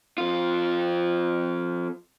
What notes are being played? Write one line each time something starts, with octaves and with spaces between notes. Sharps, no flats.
F2 F4